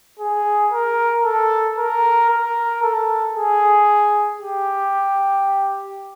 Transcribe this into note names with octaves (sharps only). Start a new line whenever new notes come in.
G#4
A#4
A4
A#4
A#4
A4
G#4
G4